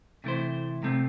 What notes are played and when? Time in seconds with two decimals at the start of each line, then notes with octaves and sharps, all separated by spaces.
0.24 C3 E3 A3 E4 C5
0.83 C3 A3 C4